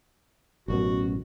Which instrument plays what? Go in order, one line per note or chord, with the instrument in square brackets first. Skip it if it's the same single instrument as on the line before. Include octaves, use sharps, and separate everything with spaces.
[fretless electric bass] A1 F#2 B2 [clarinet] F#4